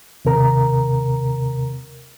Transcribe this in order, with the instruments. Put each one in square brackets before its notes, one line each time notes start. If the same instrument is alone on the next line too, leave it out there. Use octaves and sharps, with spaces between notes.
[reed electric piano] D#2 C3 A#4 A#5